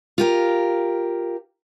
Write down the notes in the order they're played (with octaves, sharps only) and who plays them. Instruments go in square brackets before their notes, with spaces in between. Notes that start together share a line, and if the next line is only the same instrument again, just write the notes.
[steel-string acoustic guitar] F4 G4 A#4